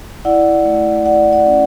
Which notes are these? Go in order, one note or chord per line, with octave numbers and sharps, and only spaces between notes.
E4 D5 F#5
A3
E4 D5 F#5
D5 F#5
C#4